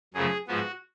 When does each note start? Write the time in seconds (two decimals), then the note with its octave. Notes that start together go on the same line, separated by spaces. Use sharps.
0.14 F#2 C#3 F3 A3 G#4
0.47 G#2 F3 B3 F#4